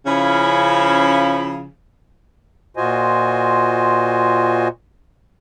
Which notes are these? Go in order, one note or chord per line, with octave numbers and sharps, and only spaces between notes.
C#3 F3 C#4 E4
A#2 F4 F#4 C5 D#5 G#5